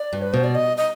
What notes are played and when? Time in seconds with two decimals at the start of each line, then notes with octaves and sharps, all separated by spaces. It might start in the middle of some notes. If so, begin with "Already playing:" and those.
Already playing: D5
0.13 G2
0.22 B4
0.33 B2 C5
0.44 D5
0.55 D#5
0.77 D#5